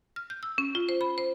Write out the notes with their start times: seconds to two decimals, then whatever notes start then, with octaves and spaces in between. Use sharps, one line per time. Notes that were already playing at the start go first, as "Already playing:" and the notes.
0.16 F6
0.30 G6
0.43 E6
0.58 C#4
0.75 F4
0.89 C5
1.01 B5
1.18 C5